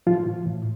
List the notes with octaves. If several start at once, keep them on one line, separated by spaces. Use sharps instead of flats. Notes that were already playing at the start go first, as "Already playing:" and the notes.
A2 F3 F4
E3
A2